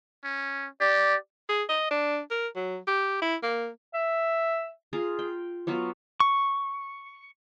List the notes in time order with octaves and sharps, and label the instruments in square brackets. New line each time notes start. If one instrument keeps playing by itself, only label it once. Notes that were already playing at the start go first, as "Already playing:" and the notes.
[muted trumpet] C#4
[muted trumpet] G4 [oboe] D5
[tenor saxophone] G#4
D#5
D4
A#4
F#3
G4
E4
A#3
[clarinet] E5
[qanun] F4 G#4 A#5
G5
F#3 B3 F4 F#4
[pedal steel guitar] C#6